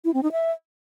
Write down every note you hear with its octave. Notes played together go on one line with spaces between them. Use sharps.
E4
C4
D#4
E5